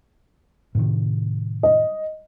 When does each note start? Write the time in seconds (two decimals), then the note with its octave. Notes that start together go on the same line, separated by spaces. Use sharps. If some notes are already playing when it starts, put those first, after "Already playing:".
0.75 A2 C3 D#3
1.63 D#5